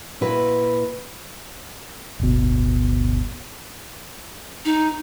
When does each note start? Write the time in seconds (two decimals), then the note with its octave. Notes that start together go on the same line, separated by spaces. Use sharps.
0.21 A#2 E4 F#4 B4
2.20 D1 G1 B2
4.65 D#4